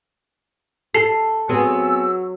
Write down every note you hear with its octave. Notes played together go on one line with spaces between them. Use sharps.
A4 C7
F#3 B3 C4 G#4 E6